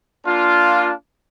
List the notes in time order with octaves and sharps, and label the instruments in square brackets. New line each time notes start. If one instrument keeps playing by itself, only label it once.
[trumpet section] A#3 D4 F4